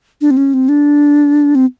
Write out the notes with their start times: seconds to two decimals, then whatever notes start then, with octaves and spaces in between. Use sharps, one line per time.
0.21 D4
0.31 C4
0.37 C#4
0.54 C4
0.69 D4
1.55 C4